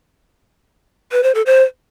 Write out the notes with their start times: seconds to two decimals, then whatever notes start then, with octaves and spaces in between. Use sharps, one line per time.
1.12 B4
1.23 C5
1.35 A4
1.46 C5